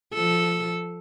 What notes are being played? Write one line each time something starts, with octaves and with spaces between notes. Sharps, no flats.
F3 A4